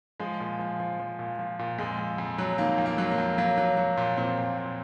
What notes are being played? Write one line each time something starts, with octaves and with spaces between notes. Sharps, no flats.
F3 G#3
A#2
F3
F3
F3
A#2
F3
A#2
F2 G#3
F2
F2
F#3
D#3 A#3
F2
A#3
F#3
A#3
F2
F#3 A#3
F#3
F#3
A#2
A#2 C4
A#2
A#2